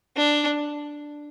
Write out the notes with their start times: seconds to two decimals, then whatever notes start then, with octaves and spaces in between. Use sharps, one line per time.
0.16 D4